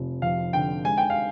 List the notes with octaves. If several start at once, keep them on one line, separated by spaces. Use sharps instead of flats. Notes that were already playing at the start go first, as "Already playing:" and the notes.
Already playing: F1 F3
F2 F5
D3 G5
G#3 G#5
G5
F5